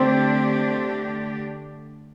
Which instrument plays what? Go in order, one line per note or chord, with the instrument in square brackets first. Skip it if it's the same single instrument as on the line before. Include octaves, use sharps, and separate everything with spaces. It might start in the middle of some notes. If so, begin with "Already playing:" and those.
Already playing: [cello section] D3 A3 D4 G4 [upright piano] C4 C5